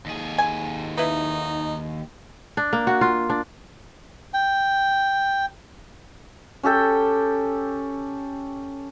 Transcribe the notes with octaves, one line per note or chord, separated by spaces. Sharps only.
D#2 G#4
G#5
D#4 E4 B4
D4
A#3
F#4
F4
D4
G5
C#4 G4 A4 G5